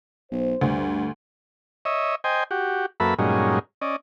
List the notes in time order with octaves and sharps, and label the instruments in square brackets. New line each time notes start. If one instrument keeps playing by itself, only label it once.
[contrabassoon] B1 [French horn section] C5
[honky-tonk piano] D2 [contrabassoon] G2
[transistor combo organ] C#5 D#5 E5
C5 D#5 G5 G#5
F#4 G4
F#2 A#3 A4 B4 E5 B5
G2 A#2 F#3 G#3 C#4 D#4
C#4 D5 D#5